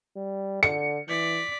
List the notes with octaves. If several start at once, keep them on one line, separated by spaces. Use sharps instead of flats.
G3
D3 C#7
E3 D5 B6